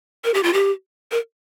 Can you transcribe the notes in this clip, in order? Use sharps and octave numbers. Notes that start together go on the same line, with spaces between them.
A#4
G4
F4
G4
A#4